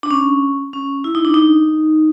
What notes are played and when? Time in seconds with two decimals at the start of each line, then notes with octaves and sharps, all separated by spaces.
0.03 D4
0.11 C#4
0.73 C#4
1.04 E4
1.15 D#4
1.25 D4
1.34 D#4